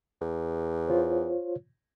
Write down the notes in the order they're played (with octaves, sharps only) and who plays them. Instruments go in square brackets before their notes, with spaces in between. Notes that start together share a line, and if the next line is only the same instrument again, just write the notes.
[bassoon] E2
[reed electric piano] F4 C5 C#5